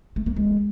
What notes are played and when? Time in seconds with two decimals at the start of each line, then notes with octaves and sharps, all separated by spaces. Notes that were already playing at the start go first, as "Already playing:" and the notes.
0.16 A3
0.26 A#3
0.36 G#3